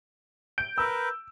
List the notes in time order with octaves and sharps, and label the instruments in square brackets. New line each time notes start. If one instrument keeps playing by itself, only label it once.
[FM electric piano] G6 [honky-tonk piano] D7
[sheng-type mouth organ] A#4 B4 [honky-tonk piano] E6